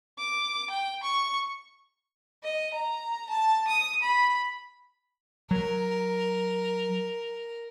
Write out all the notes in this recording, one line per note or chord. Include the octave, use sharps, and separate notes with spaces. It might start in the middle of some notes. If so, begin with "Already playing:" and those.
D6
G5
C#6
D#5
A#5
A5
D#6
B5
F#3 A#4